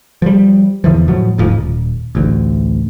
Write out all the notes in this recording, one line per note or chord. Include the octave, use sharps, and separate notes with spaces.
F3 G3
E2 D3 E3 F3
A2 F3 F#3
D#1 D2 G#2 F3
D#1
A1 D2